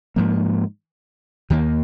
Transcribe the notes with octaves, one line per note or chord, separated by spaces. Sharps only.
G#2 F3 A#3
D#2 D#3 A#3